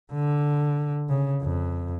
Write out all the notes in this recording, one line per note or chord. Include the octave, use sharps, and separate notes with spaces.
D3
C#3
F2